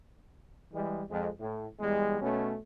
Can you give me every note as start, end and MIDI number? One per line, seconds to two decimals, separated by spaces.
0.73 1.02 52
0.73 1.02 55
0.73 1.02 56
1.10 1.29 41
1.10 1.29 56
1.40 1.67 45
1.80 2.19 40
1.80 2.19 55
1.80 2.19 56
2.21 2.55 47
2.21 2.55 57
2.21 2.55 61